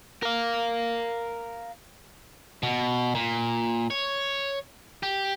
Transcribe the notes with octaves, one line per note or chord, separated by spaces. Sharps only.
A#4 F5
B2
A#2
C#5
G4